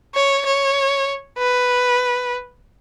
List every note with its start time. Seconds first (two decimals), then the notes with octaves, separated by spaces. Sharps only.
0.15 C#5
0.46 C#5
1.38 B4